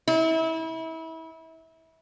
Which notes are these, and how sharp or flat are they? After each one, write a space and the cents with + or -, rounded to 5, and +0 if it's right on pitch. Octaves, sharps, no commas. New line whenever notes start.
E4 -30